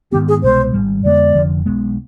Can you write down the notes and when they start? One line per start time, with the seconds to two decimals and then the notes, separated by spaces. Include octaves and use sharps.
0.12 G#2 D#3 B3 G4
0.28 G#4
0.43 C2 B2 G#3 C5
0.73 G#1 G#2 G3
1.04 F2 D3 G#3 B3 D5
1.35 F1 F2 D3 F3
1.66 B1 B2 G#3 B3